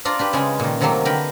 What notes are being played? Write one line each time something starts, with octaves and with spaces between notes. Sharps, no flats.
D4 F4 D5 A#5
D4 G4 B4
C#3 G#3 C#4
A#2 D#3
C3 D#3 F#3 A3 A#3
D3 A#4 B4 G5